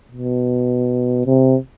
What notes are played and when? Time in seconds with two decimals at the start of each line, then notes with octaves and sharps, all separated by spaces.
0.12 B2
1.26 C3